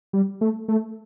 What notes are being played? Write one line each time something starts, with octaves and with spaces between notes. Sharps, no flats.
G3
A3
A3